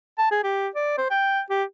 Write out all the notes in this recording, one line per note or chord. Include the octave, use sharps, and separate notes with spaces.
A5
G#4
G4
D5
C5
G5
G4